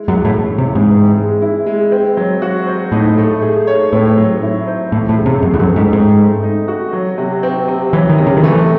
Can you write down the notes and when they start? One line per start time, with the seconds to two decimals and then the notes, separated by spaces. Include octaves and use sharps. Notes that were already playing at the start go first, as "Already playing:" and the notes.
Already playing: G#3 E4
0.08 F#2
0.17 E3
0.25 A2
0.42 C#4
0.58 C3
0.66 E3
0.75 G#2
0.92 C4
1.17 G#3
1.42 E4
1.66 G#3
1.92 C4
2.17 F#3
2.42 F#4
2.67 C5
2.92 A2 D#4
3.17 A3
3.42 G#4
3.67 C#5
3.92 A2 C4
4.17 F#3
4.42 E4
4.67 C5
4.92 A2 E3
5.09 A2
5.18 C#3
5.26 C3
5.42 F#2 A3
5.54 E2
5.60 F#2
5.68 C4
5.76 G#2
5.92 G#2 C4
6.18 A3
6.43 D#4
6.68 F#4
6.93 F#3
7.18 C3
7.43 C4
7.68 C3
7.93 E3 F#3
8.09 D#3
8.18 C3
8.27 C#3
8.37 D#3
8.43 E3 A3